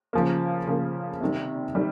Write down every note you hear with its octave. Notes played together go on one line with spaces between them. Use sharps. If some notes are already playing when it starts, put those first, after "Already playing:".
C#3 F3 A#3
C#3 F3 A#3
C3 D#3 G3
D#3 G3